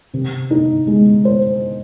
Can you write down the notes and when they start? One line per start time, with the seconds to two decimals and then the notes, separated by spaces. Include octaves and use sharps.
0.14 C3
0.51 D#4
0.87 G#3
1.25 C5